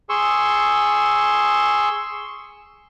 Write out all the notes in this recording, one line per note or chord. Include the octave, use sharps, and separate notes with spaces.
G#4 C6 C#6 E6